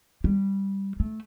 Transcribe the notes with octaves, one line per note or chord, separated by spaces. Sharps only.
G3
A3